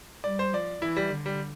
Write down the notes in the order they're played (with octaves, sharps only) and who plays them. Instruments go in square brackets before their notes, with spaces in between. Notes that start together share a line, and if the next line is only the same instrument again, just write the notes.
[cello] G3 [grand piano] D5
[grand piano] C5
[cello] F3 [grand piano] D5
[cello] E3 [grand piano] E4
[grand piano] G3
[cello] D3
[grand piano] G3